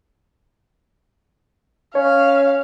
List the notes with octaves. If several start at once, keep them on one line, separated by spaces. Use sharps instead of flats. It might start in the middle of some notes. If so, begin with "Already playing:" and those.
C#4 C#5 F5